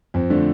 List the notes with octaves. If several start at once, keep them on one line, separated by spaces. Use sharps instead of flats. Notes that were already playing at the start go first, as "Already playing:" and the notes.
F2 C4
D3 F3 A3 D4